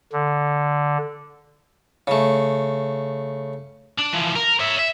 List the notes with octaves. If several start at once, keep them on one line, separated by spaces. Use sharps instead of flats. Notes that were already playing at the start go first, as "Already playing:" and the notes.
D3
C#3 A3
D4
E3 F3
A#4
C#5 E5
E5